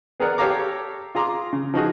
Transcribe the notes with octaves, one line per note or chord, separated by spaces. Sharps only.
B3 G#4 A#4 D5 F#5
G4 A4 C#5 F5 A#5 D6
F4 G#4 A#5 C6 D6
C#3
F3 D#4 F#4 G#4